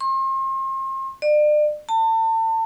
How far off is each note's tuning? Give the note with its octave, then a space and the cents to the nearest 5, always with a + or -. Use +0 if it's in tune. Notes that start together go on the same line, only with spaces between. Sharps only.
C6 +40
D5 +35
A5 +35